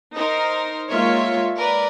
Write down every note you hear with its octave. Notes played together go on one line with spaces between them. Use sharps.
D#4 A#4 C5
G#3 A#3 F4 C#5 E5
A#4 B4 D5